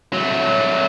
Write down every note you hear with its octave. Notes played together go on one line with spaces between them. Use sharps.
F#3 A3